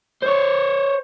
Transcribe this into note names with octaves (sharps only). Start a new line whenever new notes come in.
C5 C#5